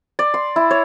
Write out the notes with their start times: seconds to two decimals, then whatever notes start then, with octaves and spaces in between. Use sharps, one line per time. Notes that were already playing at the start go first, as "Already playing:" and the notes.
0.19 D5
0.34 C6
0.56 E4
0.71 C#5